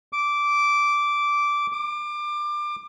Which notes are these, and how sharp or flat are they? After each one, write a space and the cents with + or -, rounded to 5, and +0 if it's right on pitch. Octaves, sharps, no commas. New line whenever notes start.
D6 -10
D6 +25